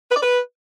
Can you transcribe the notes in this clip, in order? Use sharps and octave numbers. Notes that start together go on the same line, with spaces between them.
B4
D5
B4